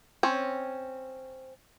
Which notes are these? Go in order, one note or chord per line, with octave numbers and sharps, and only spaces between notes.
C4 C#4